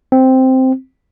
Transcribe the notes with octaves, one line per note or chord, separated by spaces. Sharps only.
C4